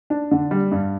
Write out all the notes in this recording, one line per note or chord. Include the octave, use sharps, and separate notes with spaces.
D4
D3
G3
G2